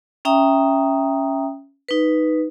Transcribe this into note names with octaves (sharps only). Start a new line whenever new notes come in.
C#4 E5 G5 A#5 D#6
D#4 B4